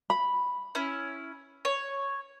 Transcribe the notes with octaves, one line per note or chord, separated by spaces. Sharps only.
B5
C#4 E4
C#5